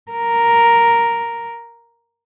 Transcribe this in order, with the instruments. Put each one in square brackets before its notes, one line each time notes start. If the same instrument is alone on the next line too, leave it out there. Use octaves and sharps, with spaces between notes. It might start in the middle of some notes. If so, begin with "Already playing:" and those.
[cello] A#4